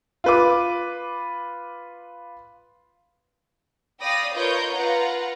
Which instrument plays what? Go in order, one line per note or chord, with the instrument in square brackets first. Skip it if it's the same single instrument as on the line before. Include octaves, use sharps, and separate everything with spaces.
[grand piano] F4 B4 D6
[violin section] D5 F5 G5 B5 D#6 A#6
F4 A#4 B4 C#5 D#5 G6
F4 B4 F#5 A#5